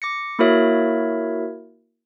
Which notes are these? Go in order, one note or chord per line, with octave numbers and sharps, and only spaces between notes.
D6 A#6 C#7
A#3 E4 F#4 A#4 C#5 E5